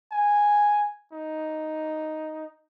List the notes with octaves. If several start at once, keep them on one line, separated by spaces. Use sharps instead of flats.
G#5
D#4